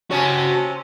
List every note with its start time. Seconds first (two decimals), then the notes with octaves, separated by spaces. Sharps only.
0.11 C3 C#4 F#4 A5